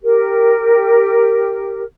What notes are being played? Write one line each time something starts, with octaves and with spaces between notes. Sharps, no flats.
G4 A#4